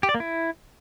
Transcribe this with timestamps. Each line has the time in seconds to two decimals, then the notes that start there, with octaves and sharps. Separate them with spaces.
0.03 G4
0.09 D5
0.14 A#3
0.20 E4